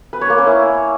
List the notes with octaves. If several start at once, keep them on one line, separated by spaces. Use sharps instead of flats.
B4
C#5
A#3
C#4
E4